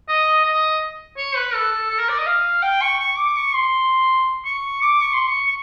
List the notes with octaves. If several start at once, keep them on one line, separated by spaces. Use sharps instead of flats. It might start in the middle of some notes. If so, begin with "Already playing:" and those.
D#5
D#5
C#5
B4
A4
A4
A4
A#4
D5
D#5
F5
G5
C#6
C#6
D6
D6
C#6
C6
C#6
D6
C#6
C6
C#6
C#6